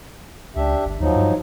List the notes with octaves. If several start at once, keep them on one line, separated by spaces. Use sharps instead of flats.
C#2 D4 G4 E5
G1
D#2 F3 F#3 D#4
G2